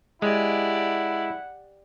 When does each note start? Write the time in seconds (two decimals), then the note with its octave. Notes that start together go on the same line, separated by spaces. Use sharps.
0.22 G#3 E4 G4 D5 F#5